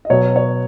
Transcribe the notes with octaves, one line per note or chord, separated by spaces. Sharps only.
D#5
B2 F#3 B3 C#5
C#5